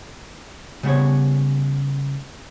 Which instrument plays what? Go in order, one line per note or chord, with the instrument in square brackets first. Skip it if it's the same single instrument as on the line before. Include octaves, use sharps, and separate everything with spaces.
[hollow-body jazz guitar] C#3 G3 B3 C#5